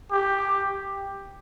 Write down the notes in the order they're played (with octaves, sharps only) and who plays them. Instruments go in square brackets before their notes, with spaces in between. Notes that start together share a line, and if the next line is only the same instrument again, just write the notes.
[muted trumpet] G4